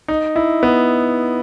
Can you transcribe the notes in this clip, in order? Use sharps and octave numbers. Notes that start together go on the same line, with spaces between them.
D#4
E4
B3